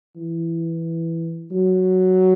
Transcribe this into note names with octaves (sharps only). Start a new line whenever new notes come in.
E3
F#3